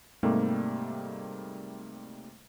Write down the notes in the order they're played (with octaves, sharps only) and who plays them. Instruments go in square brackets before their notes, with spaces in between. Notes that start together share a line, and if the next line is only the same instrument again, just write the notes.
[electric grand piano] G#2 C3 G3 A3 A#3